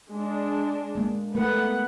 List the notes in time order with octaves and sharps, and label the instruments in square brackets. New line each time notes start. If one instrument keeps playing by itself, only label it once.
[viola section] G#3 D4
[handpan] G#3 A#3
[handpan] A3 A#4 B4 [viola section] B3 F#5